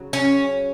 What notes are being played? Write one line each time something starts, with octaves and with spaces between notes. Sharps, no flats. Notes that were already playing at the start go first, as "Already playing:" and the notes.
Already playing: C#3 F#3
C#4